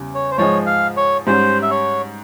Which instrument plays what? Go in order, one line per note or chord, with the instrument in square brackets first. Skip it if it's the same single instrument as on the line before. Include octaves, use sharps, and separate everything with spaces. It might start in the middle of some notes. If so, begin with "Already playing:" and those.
Already playing: [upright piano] E2 C#3 G3
[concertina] C#5
C5
[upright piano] G#2 F3 G#3 [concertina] C#5
[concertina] F5
C#5
[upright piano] G#2 G3 C#4 [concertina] C5
[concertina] E5
C#5